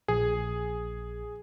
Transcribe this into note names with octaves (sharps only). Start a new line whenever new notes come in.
A#1 G#4